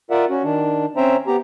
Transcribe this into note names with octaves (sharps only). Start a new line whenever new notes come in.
F4 A#4 D5 E5 F#5
C#4 F#4
D#3 D4
C4 C#4 C5 E5 G5 A#5
B3 G4 A#5